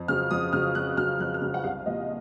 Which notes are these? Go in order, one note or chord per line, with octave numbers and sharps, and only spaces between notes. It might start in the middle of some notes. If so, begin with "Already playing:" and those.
Already playing: F2
C#3 F#3 F6
F2 D#6
C#3 F#3 F6
F2 F#6
C#3 F#3 F6
F2 F#6
F6
C#3 F#3
F#5
C2 F5
A#2 F3 D#5